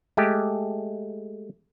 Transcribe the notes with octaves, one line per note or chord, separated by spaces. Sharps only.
G#3 A3 G4